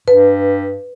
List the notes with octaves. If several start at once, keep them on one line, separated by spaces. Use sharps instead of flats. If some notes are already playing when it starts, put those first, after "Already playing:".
G2 B4